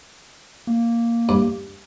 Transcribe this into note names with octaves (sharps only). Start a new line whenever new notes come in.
A#3
G2